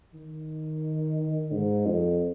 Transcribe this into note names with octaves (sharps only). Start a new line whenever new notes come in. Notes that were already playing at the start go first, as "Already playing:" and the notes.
D#3
G#2
F2